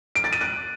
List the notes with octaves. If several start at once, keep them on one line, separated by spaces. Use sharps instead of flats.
D7
A6
D#7
F#6